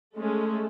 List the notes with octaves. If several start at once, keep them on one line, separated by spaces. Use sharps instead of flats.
G#3 A3 C#4 A4